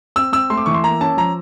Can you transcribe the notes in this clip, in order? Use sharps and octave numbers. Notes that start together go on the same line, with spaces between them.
C4 E6
C4 E6
A3 C6
D6
E3 C#6
C6
A#3 A#5
C#4 A5
F3 A#5